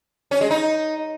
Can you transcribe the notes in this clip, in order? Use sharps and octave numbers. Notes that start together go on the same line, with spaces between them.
C#4
G#3
D#4